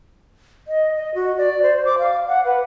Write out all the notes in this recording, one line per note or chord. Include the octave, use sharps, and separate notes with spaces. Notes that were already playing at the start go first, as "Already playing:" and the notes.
D#5
D#5
F#4
D5
C5
D6
F5
F#5
B4